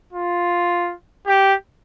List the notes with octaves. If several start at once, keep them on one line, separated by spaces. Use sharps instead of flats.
F4
G4